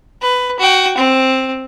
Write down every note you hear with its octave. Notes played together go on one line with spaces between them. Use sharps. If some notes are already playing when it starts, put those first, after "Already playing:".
B4
F#4 G5
C4